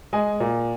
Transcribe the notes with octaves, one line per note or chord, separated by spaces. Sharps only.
G#3 D#5 G#5
A#2